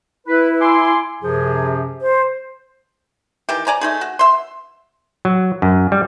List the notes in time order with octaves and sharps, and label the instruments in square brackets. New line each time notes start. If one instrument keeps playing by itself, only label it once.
[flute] E4 [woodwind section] B4
[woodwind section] G#5 C6 D6
[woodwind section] F#2 C3 F3 [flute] G#4
[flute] C5
[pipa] D#3 E3 G4
D5 G#5 A#5
A3 D#4 G#4
F#4
E5 C6
[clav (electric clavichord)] F#3
F#2
G3